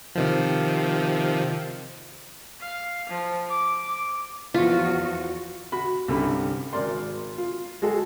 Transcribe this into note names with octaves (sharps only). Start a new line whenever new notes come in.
C3 D#3 F3
F5
F3
D6
E2 F3 F4 F#4
F#4 B5
C2 G2 D3 C#4 B5
G#1 A#4 D5 C6
F4
G#3 F#4 G#4 A4